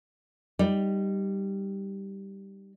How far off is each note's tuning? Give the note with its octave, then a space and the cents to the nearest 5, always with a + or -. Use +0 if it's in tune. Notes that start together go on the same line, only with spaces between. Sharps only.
G3 +0 D#4 +0